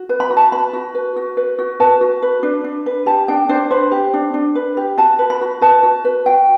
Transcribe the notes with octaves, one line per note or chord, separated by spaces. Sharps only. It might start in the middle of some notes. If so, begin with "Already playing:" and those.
Already playing: F#4
B4
B5
F#4
A5
B4 B5
F#4
B4
F#4
B4
F#4
B4 A5
F#4
B4
D4
D4
B4
G4 A5
D4 G5
D4 C5
B4 C5
G4
D4
D4
B4
G4
F#4 A5
B4
B5
F#4
B4 A5
F#4
B4
F#4 G5